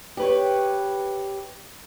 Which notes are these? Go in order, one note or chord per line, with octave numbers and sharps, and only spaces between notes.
G4 B4 C#5